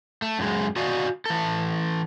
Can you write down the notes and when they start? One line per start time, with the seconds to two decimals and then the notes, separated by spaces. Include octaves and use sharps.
0.22 A3
0.39 F#2 G#3
0.76 F#4 D5 D#5 F5 G#5
1.26 E3 A4